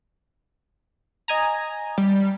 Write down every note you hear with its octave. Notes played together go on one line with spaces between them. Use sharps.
D#5 G#5 A#5
G3